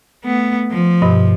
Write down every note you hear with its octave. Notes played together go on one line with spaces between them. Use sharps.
A3 B3
F3
G2 B2 D#5